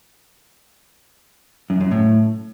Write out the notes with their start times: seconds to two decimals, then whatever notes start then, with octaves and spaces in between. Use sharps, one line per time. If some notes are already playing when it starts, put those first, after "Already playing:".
1.70 F#2
1.81 F#2
1.91 A2